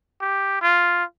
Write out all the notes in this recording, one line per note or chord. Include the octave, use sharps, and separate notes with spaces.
G4
F4